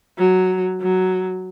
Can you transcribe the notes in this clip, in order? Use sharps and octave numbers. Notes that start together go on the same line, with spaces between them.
F#3
F#3